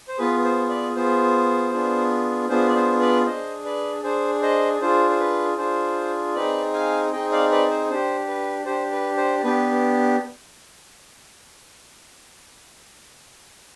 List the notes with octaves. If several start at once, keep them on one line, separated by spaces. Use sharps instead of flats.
C5
B3 F4 G#4 B4
C5
B4 D5
B3 F4 G#4 C5
B3 D4 F4 G#4
B3 D4 F4 G#4 C5
D5
C5
B4 D5
D4 G#4 C5 D#5
B4 D5
D4 G#4 C5
C5 D#5
D4 F4 G#4 C5
C5
B4
D4 F4 G#4 C5
C4 D#4 G#4 B4 D5
F5 G#5
C4 D#4 G#4 D#5 G5
D5 F5
B4 D5
C5
D4 G4 C5
B4
D4 G4 C5
B4
C5
B3 D4 G4 B4